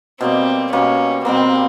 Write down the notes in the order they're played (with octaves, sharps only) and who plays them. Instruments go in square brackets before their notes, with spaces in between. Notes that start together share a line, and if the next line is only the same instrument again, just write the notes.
[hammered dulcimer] B2 G3 A#3 [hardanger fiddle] C4
[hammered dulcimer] B2 G3 A#3 [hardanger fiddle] C#4
[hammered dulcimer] B2 G3 A#3 [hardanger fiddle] C4